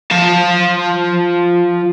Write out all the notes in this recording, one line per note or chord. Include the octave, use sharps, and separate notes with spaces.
F3 A5